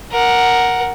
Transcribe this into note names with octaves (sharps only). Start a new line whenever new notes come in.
A#4 F#5